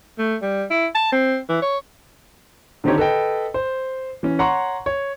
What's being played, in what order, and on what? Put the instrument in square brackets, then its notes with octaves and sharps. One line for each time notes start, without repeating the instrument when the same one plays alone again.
[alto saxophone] A3
G3
E4
A5
C4
E3
C#5
[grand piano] D3 D#3 C4 D#4 G4 C#5
A4 B4 D#5 G5
C5
E3 C#4
C#5 F#5 A#5 C6 C#6
C#5